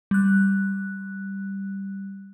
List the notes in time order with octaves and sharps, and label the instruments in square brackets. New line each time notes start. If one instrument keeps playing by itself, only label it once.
[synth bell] G3 F#6